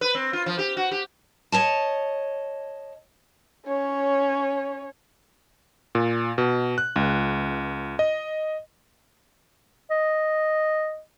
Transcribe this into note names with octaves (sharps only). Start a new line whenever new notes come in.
B4
C4
F4
F3
G4
F#4
G4
C#5 D#5 A5
C#4 C#5
A#2
B2
F#6
C#2
D#5
D#5